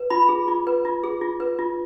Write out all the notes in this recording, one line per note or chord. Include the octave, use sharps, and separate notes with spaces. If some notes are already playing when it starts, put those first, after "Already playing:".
Already playing: B4
F4 B5
G#4
F4
B4
F4
G#4
F4
B4
F4